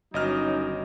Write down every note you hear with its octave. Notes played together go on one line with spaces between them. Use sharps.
G1 D#3 F#3 C#4 D#4 D#5 F6